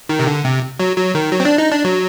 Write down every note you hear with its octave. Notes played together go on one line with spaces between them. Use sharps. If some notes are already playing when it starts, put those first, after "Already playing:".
D#3
C3
D3
C3
F#3
F#3
D#3
F#3
C4
D4
D#4
D4
F#3